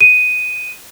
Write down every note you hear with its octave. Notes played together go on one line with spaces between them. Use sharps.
D#7